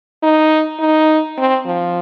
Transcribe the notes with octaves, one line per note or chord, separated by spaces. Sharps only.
D#4
D#4
C4
F3